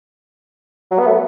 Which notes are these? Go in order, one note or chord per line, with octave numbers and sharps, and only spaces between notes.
F#3
B3
A3